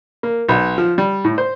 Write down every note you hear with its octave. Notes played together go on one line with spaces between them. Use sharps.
A#3
B1
F3
G3
A2
C5